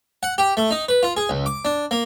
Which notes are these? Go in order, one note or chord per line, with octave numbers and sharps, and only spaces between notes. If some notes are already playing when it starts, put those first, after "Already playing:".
F#5
G4
A3
D#4
B4
F4
G#4
C#2
D6
D4
A#3